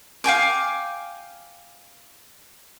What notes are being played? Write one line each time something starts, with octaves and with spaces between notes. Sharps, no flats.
F5 G5 G#5 D6